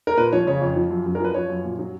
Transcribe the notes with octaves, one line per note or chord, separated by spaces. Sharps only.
A#4
A#2 B4
F3 C#5
C#3 C#5
F2
F3
F#2
F#2
A#4
F3 B4
F3 C#5
F#2
A#2
F#3